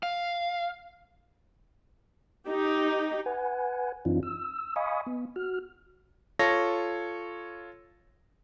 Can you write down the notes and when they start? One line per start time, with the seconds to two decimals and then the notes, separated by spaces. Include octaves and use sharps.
0.03 F5
2.46 D#4 G4
3.26 B4 F#5 G#5
4.05 F#2 E3 C4 D4 D#4 F4
4.23 E6
4.76 D#5 F5 G#5 B5 C#6 D#6
5.07 B3
5.36 F#4 F6
6.39 F4 A4 C#5 A#6